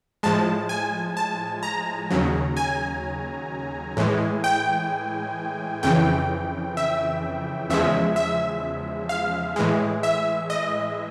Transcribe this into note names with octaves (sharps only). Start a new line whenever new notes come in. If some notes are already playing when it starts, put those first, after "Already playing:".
A2 F3 G#3 A5
G#5
A5
A#5
D#2 C#3 F#3
G#5
A2 E3 G#3
G5
F2 C#3 E3 G5
E5
E2 C#3 F3 G#3 E5
E5
F5
A2 E3 G#3
E5
D#5